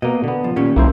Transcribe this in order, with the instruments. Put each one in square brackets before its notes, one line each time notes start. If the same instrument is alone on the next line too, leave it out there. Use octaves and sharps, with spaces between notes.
[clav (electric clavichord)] B2 A#3 [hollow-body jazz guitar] D#5
[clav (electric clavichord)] D3 B3
[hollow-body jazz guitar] F3
[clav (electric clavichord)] A#2 [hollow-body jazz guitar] D#3 C#4 G4
[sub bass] B1 [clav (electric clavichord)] A#3 E4 C5